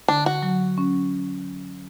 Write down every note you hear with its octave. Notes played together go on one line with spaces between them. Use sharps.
D3 D4
F#4
F#3
C#4